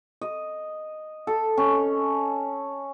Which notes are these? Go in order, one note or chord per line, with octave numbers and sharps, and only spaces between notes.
D#5
A4
C#4